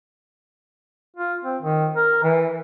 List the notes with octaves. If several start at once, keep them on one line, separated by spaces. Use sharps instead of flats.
F4
C4
D#3
A#4
E3